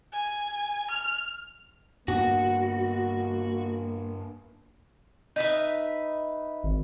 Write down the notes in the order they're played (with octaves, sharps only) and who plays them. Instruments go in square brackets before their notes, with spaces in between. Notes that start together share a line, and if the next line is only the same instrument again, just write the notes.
[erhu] G#5
F6
[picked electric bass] G2 B3 D4 [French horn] A#3 [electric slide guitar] F#4
[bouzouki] D#4 B4 E5
[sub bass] G#1